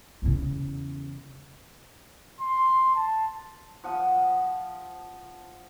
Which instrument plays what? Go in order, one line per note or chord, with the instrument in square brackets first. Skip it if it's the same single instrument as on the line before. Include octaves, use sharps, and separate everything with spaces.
[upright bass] E2 C#3
[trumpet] C6
A5
[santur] F3 F#5 D#6